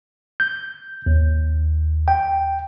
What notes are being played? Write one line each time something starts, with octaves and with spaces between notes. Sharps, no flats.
G6
D#2
G5